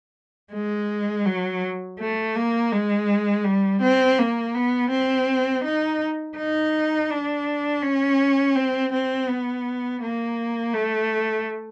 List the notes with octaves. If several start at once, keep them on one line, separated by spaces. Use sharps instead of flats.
G#3
F#3
A3
A#3
G#3
G3
C4
A#3
B3
C4
D#4
D#4
D4
C#4
C4
C4
B3
A#3
A3